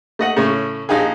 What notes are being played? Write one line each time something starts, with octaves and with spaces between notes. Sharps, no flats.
A3 D#5 F#5
A2 C#3 A3 C#4 C#5
A#1 D#4 G4 G#4